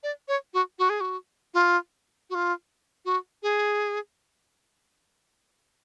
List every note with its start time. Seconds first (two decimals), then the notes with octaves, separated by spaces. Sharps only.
0.03 D5
0.28 C#5
0.54 F#4
0.79 F#4
0.89 G#4
1.00 F#4
1.54 F4
2.30 F#4
2.35 F4
3.05 F#4
3.43 G#4